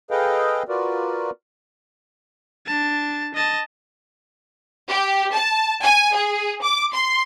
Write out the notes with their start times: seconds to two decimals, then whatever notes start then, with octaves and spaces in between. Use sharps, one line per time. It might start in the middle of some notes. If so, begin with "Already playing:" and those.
0.11 G#4 A4 B4 D#5 F5 G5
0.68 F4 F#4 A#4 B4 D5
2.66 D4 A5
3.34 D#5 A5
4.90 G4
5.34 A5
5.83 G#5
6.14 G#4
6.61 D6
6.93 C6